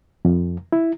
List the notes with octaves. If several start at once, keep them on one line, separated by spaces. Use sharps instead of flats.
F2
E4